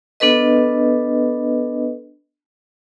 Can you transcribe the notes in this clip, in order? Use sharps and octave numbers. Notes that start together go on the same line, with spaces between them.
B3 D4 A4 B4 D#5